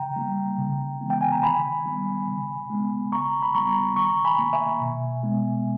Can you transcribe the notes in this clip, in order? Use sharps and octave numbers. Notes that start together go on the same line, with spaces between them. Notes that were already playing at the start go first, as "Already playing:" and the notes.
Already playing: C#3 G5 A#5
G3 A#3
C#3
E3 G#3 B3
G5
G#5
A#5
D#3 G#5 B5
G3 B3
C#3
G#3 B3
C#3 A#5 C#6
B5
G3 B3 A#5 C#6
D#3 A#5 C#6
G#5 B5
A#3
E5 G#5
B2
G#3 B3